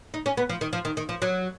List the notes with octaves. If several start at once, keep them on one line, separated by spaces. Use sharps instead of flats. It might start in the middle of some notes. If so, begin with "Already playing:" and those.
D#4
C#4
B3
F3
D#3
F3
D#3
D#3
F3
F#3